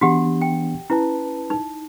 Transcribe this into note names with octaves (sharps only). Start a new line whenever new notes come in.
E3 B3 D4 F#4 G4 F#5
G5
C#4 E4 B4 A5
D#4